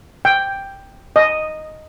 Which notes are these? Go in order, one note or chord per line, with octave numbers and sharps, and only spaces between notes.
G5
D#5